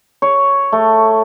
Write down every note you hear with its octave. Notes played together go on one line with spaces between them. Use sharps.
C#5
A3